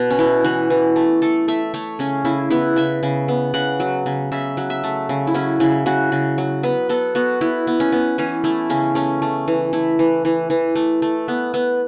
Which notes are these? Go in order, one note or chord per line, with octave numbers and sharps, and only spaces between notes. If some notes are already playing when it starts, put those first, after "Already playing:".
Already playing: B2
C#4
B3 E4
E3 F#4
E3
A3
A3 A4
A3 E5
A3 C#5
C#3 C#4
C#3 E4
B3 E4
C#3 E5
C#3
B3
C#3 F#5
F#3
C#3
C#3 E5
F#3
E5
A3
C#3
E4
F#3 C#4
C#3 E4
C#3 F#4
C#3
F#3
B3 B4
B3 A4
B3 F#4
B3 E4
B3
C#4
B3
E3 C#4
A3 E4
C#3 C#4
A3 C#4
A3
E3
A3 E4
E3
E3
E3
A3
A3
B3
B3